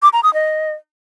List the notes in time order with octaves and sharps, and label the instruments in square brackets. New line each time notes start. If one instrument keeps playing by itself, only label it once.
[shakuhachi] D6
A#5
D#6
D#5